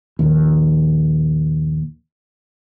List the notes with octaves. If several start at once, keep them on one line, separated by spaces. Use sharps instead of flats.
A#1 D#2